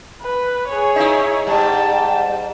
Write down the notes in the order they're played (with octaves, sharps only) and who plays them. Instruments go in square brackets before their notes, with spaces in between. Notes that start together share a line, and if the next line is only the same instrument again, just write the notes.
[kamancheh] B4
G#4 C#5
[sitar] D#4 E4
[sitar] G#2 G3 [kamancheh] G5 A5